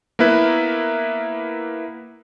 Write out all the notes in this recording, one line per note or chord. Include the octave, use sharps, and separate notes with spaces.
A#3 B3 E4 B4